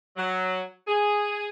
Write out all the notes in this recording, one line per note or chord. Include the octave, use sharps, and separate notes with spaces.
F#3
G#4